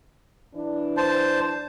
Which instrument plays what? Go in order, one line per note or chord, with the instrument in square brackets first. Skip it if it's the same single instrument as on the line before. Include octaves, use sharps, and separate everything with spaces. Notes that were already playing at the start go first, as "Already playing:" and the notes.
[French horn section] E3 D4
[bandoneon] C5 A5